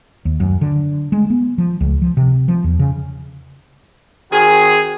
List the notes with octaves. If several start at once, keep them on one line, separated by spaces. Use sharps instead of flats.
D#2
F#2
D3
G#3
B3
F3
C#2
F3
C3
F3
E2
C#3
D#3 C4 F#4 G#4